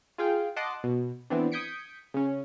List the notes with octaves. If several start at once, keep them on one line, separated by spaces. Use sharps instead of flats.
F4 G#4 F5 G5
D#5 F#5 A5 C6 D6 F#6
B2
E3 B3 C4 D4
D#6 G6 G#6 B6 C#7 D7
C#3 C#4